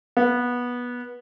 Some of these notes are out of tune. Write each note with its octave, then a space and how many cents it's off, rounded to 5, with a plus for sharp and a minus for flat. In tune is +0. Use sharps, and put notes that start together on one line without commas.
B3 -15